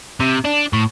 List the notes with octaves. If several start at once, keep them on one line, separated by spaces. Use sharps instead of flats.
C3
D4
A2